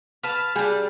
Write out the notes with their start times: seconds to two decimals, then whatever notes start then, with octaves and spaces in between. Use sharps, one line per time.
0.23 B4 A5 F6
0.56 G3 D4 G#4